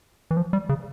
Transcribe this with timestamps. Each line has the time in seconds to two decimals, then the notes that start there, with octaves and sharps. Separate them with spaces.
0.31 E3
0.37 F3
0.53 G3
0.69 C#3